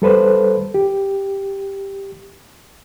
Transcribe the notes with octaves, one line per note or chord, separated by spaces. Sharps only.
G3 A4 B4 C5
G4